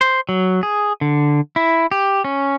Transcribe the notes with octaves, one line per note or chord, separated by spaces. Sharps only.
C5
F#3
G#4
D3
E4
G4
C#4